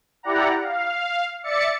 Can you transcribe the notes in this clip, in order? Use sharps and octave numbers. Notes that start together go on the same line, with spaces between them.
E4 G4 D5 F#5 A#5
F5
D5 E5 A6 C#7